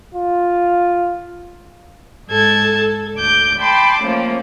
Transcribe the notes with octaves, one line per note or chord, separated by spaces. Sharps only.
F4
G#2 A4 A5 G#6
A4
D2 D6 G6
G5 A5 B5 C6 D6
F3 A3 A#3 C#4